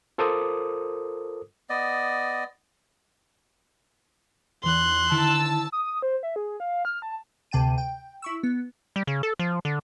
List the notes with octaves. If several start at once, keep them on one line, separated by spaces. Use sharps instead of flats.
F4 A4 A#4 C5 D6 D#6
B3 D5 D#5
E2 E3 C6 F#6
D3 D#3 E4 A5 E6
D#6
C5
E5
G#4
F5
F6
A5
D2 C3 G5 A5 D#7
G5
E4 C#6 E6
B3
G3
C#3
A4
F3
D3